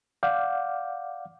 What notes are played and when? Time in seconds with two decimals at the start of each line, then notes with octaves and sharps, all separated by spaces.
0.23 D5 F5 F#5 D6 F6 G6